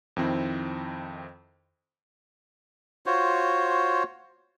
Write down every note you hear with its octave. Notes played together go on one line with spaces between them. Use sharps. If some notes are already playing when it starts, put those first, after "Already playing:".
F2 D#3 C4 E4
F4 F#4 C5 C#5